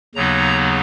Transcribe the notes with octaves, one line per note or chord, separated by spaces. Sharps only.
D#2 C#3 F#3 B3 D#4 A#5